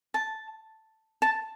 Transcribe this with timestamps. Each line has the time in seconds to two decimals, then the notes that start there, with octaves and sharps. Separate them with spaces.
0.14 A5
1.22 A5